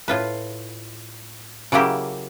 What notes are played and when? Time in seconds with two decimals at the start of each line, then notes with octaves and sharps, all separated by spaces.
0.08 A2 F4 B4
1.72 C#3 F#3 A#3 E4 G4